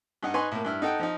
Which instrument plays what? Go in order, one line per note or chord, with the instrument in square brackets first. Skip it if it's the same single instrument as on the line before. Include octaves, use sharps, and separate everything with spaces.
[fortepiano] G2 D#4 D#5 F#5
D#4 B4 G#5 C6 C#6
A2 A#3
G2 E4 F6
D#4 A4 F#5 G5
F3 D#4